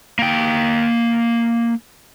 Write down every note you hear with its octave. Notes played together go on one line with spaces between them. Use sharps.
A#3 G5